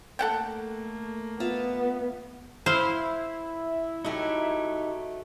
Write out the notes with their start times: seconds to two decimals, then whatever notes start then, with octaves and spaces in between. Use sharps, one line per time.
0.19 A3 A#3 A4 F#5 G5
1.40 B3 F4 E5
2.66 E4 C5 F5
4.05 F#3 A3 D#4 G4